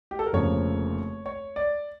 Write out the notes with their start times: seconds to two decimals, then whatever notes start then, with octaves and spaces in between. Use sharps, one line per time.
0.11 G4
0.19 A4
0.26 A#4
0.33 F1 F2 C#3 F3 A#3 C#5
1.26 C#5
1.56 D5